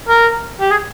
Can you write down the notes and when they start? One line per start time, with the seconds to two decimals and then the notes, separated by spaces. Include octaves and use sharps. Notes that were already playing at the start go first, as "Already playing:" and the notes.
0.09 A#4
0.60 G4
0.71 G#4